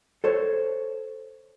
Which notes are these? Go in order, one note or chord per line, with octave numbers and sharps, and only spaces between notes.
A4 C5 C#5